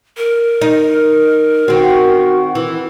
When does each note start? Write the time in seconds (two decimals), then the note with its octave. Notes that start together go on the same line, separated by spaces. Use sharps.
0.17 A#4
0.61 D#4
1.68 D#3 C4 F#4
2.55 E3